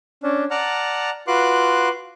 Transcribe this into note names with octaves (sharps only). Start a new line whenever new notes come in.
C#4 D4
D5 F#5 A5 A#5 F6
F4 F#4 B4 C6 D6 F#6